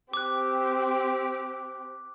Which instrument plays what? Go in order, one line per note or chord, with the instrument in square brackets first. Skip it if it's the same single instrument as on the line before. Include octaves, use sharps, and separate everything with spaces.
[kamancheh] C4 G4 [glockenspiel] D6 F#6